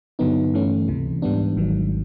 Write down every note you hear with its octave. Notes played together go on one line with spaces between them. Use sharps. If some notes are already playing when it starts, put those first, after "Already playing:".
G2 D3 F#3 B3 D#4
G2 E3 A3 C#4
C#2 C3 E3
G#2 E3 G3 B3 D4
G#1 G#2 D#3 F#3